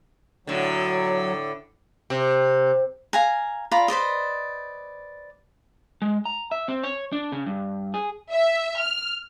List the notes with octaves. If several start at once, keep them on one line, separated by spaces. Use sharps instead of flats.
A2 D3 F#3
C3
F5 G#5 A#5
F4 D5 A#5 B5
B4 C5 D5 D#5
G#3
A#5
E5
C4
C#5
D4
C#3
G2
G#4
E5
F6